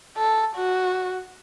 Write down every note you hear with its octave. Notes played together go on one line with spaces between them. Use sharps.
A4
F#4